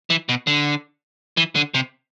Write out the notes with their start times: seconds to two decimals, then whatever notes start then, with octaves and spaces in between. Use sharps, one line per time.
0.10 E3
0.29 B2
0.47 D3
1.37 E3
1.55 D3
1.74 C3